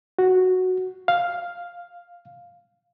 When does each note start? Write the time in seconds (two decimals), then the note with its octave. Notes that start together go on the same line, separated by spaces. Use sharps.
0.19 F#4
1.08 F5